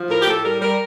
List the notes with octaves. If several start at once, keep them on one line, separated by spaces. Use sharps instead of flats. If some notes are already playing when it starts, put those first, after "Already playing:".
Already playing: F3
A2 A#4
G4
A2 A4
G3 A#4
G3 A#4